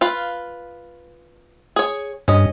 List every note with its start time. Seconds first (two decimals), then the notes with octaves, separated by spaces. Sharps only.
0.01 F4 B4 F5
1.76 G#4 C#5
2.28 G2 C#4 D#5